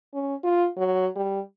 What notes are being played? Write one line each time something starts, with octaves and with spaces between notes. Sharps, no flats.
C#4
F4
F#3
G3